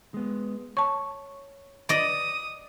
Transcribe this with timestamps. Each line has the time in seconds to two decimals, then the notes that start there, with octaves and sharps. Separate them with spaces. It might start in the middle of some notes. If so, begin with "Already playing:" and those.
0.14 G#3 B3
0.77 C#5 A5 C#6
1.89 D5 D#5 D#6